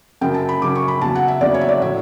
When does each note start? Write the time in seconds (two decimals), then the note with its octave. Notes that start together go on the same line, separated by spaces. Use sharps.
0.21 F#2 C#3 F#3 G5
0.34 A5
0.49 B5
0.62 F#2 C#3 F#3 D6
0.75 C#6
0.88 B5
1.01 E2 C#3 F#3 A5
1.15 F#5
1.28 E5
1.41 E2 C#3 F#3 D5
1.54 C#5
1.61 E5
1.69 D5
1.81 A2 F#3 E5